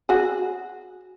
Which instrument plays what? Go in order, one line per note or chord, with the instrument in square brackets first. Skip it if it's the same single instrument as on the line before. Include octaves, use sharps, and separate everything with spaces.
[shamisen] F#4 G#4